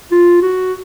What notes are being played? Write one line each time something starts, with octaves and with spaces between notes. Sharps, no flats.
F4
F#4